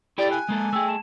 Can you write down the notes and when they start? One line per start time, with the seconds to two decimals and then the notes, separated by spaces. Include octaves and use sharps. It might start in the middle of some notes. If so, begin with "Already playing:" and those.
0.18 E4 G4 A4 D5 G5
0.31 G#5 F#6
0.49 G#3 A#3 A4
0.73 A3 G#4 G5 E6
0.88 A5 E7